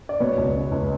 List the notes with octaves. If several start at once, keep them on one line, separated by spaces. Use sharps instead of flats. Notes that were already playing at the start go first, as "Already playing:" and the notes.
D5
B2 B4 C#5
C#2
C#2
C#2